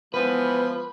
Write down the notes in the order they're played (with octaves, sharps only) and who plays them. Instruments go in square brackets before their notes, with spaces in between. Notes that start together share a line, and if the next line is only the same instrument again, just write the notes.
[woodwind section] E3 G#3 B3 [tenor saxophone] F3 [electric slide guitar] B4